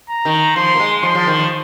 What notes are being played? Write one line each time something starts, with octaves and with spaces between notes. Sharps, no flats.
A#5
D#3
F3 C6
A#3
G#3
F3 C6
F3
D#3
F3